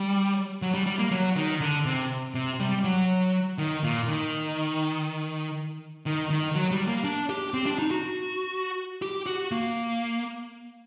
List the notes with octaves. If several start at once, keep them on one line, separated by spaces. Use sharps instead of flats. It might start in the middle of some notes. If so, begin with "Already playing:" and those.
Already playing: G3
F#3
G3
G3
A#3
F#3
D#3
D3
C3
C3
G3
F#3
D#3
A#2
D#3
D#3
D#3
F#3
G3
A#3
D4
G4
C4
D4
D#4
F#4
G4
F#4
A#3